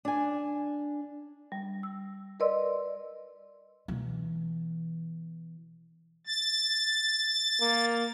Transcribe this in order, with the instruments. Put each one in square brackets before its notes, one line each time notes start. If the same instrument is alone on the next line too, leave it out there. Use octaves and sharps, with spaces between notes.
[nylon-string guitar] D4 G#5
[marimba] G3
E6
A#4 B4 D5 D#5 C6 E6
[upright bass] B2 E3
[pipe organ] A6
[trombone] A#3